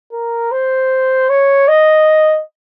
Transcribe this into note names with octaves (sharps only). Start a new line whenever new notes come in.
A#4
C5
C#5
D#5